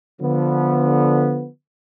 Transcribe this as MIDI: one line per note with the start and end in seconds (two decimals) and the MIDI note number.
0.21 1.46 50
0.21 1.46 53
0.21 1.46 59